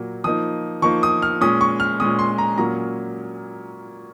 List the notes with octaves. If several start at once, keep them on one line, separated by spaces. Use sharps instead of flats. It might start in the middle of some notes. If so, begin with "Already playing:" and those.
Already playing: A#2 F#3 A#3
F3 A#3 D#4 D#6
F3 A#3 D#4 C#6
D#6
F6
A#2 G#3 C#4 D#6
C#6
F6
A#2 G#3 C#4 D#6
C6
A#5
A#2 F#3 A#3 C#4 A#5